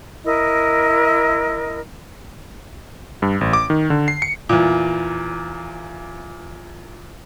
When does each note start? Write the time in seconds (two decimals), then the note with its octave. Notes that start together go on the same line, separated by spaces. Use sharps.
0.25 E4 A#4 D#5
3.22 G2
3.41 A1
3.53 D6
3.70 D#3
3.90 D3
4.08 C7
4.22 C#7
4.49 E2 A#2